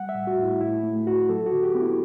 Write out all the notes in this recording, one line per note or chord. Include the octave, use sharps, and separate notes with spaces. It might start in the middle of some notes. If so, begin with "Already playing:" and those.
Already playing: G3 F#5
E5
A2
F#4
A2 E4
A2 E4
A3
A2 F#4
F#3 A4
F#4
D3
G4
B3
E4